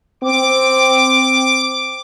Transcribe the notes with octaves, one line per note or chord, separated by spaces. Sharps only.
C4 D6